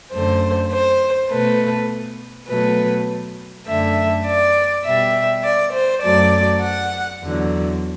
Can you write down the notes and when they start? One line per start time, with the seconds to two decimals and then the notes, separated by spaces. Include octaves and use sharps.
0.12 F#2 D3 A3 C5
0.72 C5
1.30 B2 A3 B4
2.48 B2 F#3 A3 B4
3.67 F#2 D3 A3 E5
4.26 D5
4.85 B2 G3 E5
5.44 D5
5.73 C5
6.03 F#2 F#3 A3 D5
6.63 F#5
7.22 E2 D3 F#3